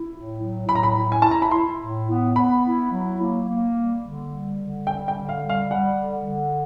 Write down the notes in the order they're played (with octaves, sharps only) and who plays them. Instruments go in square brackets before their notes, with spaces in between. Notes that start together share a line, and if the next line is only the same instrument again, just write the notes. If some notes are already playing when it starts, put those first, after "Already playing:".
Already playing: [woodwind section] E4
A2
F#3
[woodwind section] A2 [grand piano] B5
[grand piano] A#5
B5
[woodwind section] E4
[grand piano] G#5
[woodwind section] E4 [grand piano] A5
[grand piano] A#5
B5
[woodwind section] E4 [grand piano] C6
[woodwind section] A2
B3
[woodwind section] B3 [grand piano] B5
[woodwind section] E4
F#3
A#3
A#3
G3
D3
G3
D3
[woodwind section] G3 [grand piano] G5
[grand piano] G5
[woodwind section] D3
[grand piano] F5
[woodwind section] G3
[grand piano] F5
[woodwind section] G3 [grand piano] F#5
[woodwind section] D3
D3